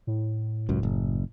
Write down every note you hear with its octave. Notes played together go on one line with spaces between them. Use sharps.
A2
C#2 F#2
F#1